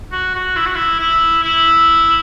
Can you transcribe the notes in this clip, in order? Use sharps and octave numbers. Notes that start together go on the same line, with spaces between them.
F#4
F#4
E4
F#4
E4
E4
E4